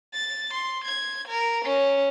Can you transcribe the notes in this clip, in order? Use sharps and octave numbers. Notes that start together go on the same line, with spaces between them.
A6
C6
G#6
A#4
C#4